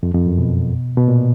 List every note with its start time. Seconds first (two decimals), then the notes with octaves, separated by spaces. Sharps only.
0.03 F2
0.14 F2
0.26 F#2
0.38 B2
0.97 B2
1.08 A#2